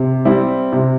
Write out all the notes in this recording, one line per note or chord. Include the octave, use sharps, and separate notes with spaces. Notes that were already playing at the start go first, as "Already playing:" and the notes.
Already playing: C3
G3 C4 E4
C3